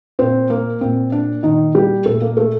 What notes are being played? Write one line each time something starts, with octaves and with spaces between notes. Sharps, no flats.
A#2 C4 C5
A#3 A#4
A#2 C4
D4
A#2 D#3 D#4
G3 G4
A#2 A3 A4
A#3 A#4
A3 A4